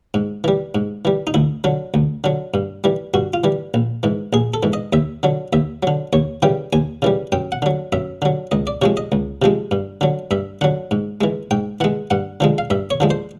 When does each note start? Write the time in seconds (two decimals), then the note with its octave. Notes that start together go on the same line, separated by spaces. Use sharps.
0.14 G#2
0.44 E3 G3
0.75 G#2
1.05 E3 G3
1.27 D#4
1.34 D2 E4
1.64 D3 F#3
1.94 D2
2.24 D3 F#3
2.54 G2
2.84 E3 G3
3.14 G2 F#4
3.34 F4
3.44 E3 G3
3.74 A#1
4.03 G#2 E3
4.33 A#1 G#4
4.54 A4
4.63 G#2 E3
4.73 D#5
4.93 D#2 E5
5.23 D3 F#3
5.53 D#2 E5
5.83 D3 F#3
6.13 D#2 C#5
6.42 C#3 E3 G3 G5
6.73 D#2 G#5
7.02 C#3 E3 G3
7.32 F#2 G5
7.52 F#5
7.62 D3 F#3
7.92 F#2 E5
8.22 D3 F#3
8.51 C#2 D#5
8.67 D5
8.82 C3 F3 G#3 C#5
8.97 D#5
9.12 C#2
9.42 C3 F3 G#3
9.71 G2
10.01 D3 F#3
10.31 G2 E5
10.61 D3 F#3 F#5
10.91 G#2
11.21 E3 G#3
11.51 G#2 G5
11.80 E3 G#3 F#5
12.11 G2 F#5
12.40 D3 F3 G#3
12.58 F5
12.70 G2 E5
12.90 C#5
13.00 D3 F3 G#3
13.10 C5